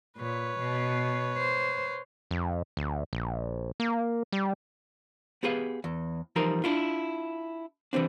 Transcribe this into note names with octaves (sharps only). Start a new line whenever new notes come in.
A#2 B4 C#5
B2
C5
F2
D2
A#1
A#3
G3
B3 G4 G#4 B4 F5
E2
E3 F3 G3 D#4 A#4 C5
D4 E4 F4
E3 G3 C4 D4